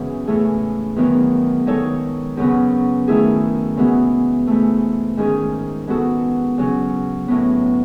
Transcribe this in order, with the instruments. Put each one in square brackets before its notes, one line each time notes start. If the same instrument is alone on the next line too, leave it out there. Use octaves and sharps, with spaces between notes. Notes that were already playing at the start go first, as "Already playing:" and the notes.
Already playing: [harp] F#2 C#3 E3 G#3 B3
A2 E3 A3 C#4 G#4
E2 D#3 F#3 B3
D#3 G#3 D#4 A4 C#5
F#2 C#3 F#3 B3
D#3 A3 E4 G#4
C#3 E3 G#3 B3 F#4
G#2 E3 A3
G#2 D#3 G#3 C#4 G#4
G#3 B3 F#4 A4
C#3 F#3 C#4
A2 F#3 B3